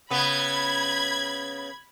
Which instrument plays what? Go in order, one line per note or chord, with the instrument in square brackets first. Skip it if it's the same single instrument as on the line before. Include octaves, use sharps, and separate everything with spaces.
[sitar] C#3 B3 [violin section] B5 G#6